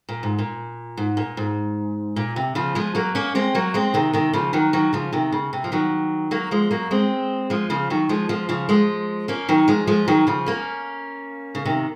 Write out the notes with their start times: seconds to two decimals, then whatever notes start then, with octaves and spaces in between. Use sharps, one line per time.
0.09 A#2
0.23 G#2
0.39 A#2
0.97 G#2
1.17 A#2
1.37 G#2
2.16 A#2
2.36 C3
2.55 C#3 F3
2.75 F3 G#3
2.95 F#3 A#3
3.15 A#3 C#4
3.35 G#3 C4
3.55 F#3 A#3
3.74 G#3 C4
3.94 C3 D#3
4.13 C3 D#3
4.33 C#3 F3
4.53 D#3 F#3
4.73 D#3 F#3
4.93 C#3 F3
5.13 C3 D#3
5.32 C#3
5.53 C3
5.64 F3
5.72 D#3 F#3
6.31 F#3 A#3
6.51 F3 G#3
6.71 F#3 A#3
6.91 G#3 C4
7.50 F3 G#3
7.70 C#3 F3
7.90 D#3 F#3
8.09 F3 G#3
8.29 F3 G#3
8.49 C#3 F3
8.69 F3 G#3
9.28 A#3 C#4
9.49 D#3 F#3
9.68 F3 G#3
9.87 F3 G#3
10.08 D#3 F#3
10.27 C#3 F3
10.46 A#3 C#4
11.55 C#3
11.65 C3 D#3